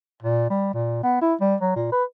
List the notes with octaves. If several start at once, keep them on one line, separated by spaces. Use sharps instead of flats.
A#2
G3
A#2
B3
E4
G3
F#3
A#2
B4